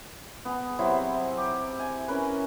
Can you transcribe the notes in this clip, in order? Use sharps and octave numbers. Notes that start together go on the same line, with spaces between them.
B3 G#4
C3 F#3 C4 E4
G4
G#5
C#4 A#4 B4